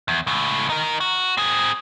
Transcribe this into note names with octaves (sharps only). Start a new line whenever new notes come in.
E2
C#2 A2
D#4 A#4
F#4
C4 G#4